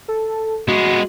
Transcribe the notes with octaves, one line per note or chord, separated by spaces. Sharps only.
A4
G#3 B3 F#4